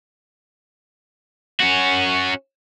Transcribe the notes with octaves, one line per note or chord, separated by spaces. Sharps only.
C#4 F#4